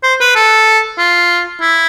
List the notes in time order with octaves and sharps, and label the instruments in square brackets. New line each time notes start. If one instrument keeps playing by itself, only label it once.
[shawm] C5
B4
A4
F4
E4